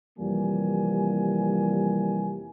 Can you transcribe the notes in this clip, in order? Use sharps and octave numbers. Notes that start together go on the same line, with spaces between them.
F2 C3 E3 G3 A#3 G#5